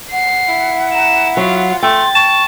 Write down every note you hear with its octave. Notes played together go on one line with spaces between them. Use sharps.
F#5 C7
E4
A#5 E7
F#3 F4 F5
A3 G5 C6 A6
A5 C#6